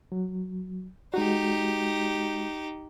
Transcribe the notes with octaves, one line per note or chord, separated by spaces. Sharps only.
F#3
G#3 D#4 F#4 G4